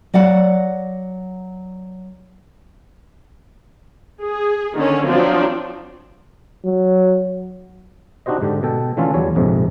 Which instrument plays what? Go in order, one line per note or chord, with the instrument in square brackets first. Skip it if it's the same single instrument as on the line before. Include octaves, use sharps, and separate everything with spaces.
[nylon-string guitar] F#3 D5 F5 F#5
[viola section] G#4
D3 D#3 C#4
F3 F#3 C4 D4
[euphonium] F#3
[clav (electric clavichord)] D4 D#4 F#4 G4 C5 D#5
G#2 D3 G4
B2 A4 G5
D3 E3 A3 C#4 F4 A4
E2 F#3 G3 C#5
A#1 F2 G#2 C3